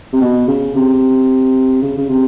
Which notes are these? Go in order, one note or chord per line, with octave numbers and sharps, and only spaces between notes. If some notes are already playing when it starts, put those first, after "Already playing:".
C3
B2
C#3
C3
C#3
C#3
C3